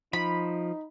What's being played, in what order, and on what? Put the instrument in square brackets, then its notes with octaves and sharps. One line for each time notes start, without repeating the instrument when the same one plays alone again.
[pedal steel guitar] F3 [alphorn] D#4 [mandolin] B5